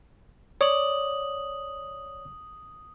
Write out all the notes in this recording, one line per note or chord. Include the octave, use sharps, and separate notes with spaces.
C#5 D5 D6 D#6 F#7